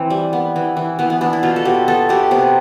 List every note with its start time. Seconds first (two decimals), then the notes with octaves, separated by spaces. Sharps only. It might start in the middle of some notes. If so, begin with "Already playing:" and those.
Already playing: E3 C4
0.10 G3
0.33 B3
0.56 E3
0.77 E3
0.99 E3 B3
1.10 B3
1.21 B3 D4
1.33 E4
1.43 B2 F4
1.56 A4
1.65 B2 G4
1.88 B3 A4
2.09 B2 G4
2.31 C3 B3